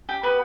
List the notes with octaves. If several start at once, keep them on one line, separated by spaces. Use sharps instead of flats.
G4
B3 B4